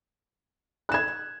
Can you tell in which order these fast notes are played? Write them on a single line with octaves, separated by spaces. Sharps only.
F#6 E7 G#6